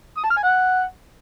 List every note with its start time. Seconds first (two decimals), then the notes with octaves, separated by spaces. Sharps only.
0.17 D#6
0.24 A5
0.30 F6
0.37 G#5
0.43 F#5